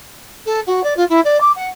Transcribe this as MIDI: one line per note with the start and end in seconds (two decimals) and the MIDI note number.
0.45 0.60 69
0.66 0.83 66
0.83 0.94 74
0.96 1.04 65
1.09 1.20 64
1.24 1.40 74
1.40 1.51 86
1.55 1.67 78